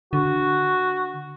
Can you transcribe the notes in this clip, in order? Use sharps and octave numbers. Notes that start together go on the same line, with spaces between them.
D3 F#4